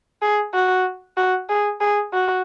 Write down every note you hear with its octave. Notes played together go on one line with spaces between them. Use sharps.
G#4
F#4
F#4
G#4
G#4
F#4